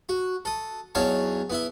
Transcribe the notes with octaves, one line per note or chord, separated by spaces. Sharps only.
F#4
A4 D#6
E2 F#3 D#4 C#5 F5 A5
B3 E4 E5